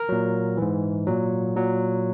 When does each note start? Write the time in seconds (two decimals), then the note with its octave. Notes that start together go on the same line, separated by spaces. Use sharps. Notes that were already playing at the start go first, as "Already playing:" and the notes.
Already playing: A#4
0.09 A#2 F#3
0.57 G#2 E3
1.07 A#2 F#3
1.56 A#2 F#3